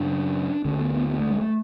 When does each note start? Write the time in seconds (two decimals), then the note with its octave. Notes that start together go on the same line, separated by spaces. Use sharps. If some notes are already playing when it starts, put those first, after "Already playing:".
Already playing: F#2 C#3 D4
0.65 D2 D3 C#4
0.79 B3
0.94 B3
1.08 B3
1.20 A3
1.30 G#3
1.41 A3